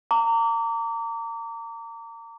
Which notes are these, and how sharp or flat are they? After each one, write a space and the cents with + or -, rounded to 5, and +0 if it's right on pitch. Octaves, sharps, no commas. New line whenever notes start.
A#5 -30 D6 -30